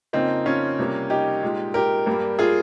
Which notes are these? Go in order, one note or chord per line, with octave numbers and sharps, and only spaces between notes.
F2 C#3 F3 A#3 C4 D#4
C#4 F4
C3 G3 A#3
D#4 G4
A#2 G#3
G4 A#4
G2 G3 A#3
F4 G#4